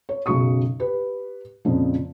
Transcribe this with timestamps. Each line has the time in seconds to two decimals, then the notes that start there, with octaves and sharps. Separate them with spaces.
0.09 C#5
0.26 B1 F#2 C#3 F#3 C#6 D#6
0.80 G4 B4
1.65 F2 A#2 C#3 F3